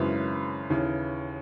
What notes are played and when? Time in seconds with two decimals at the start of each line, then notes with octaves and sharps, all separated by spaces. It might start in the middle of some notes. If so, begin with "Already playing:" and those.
Already playing: G#1 F#2 C#3 E3 B4
0.70 D#2 C#3 E3